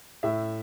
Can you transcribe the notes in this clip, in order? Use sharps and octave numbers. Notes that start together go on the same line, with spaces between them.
A2 E5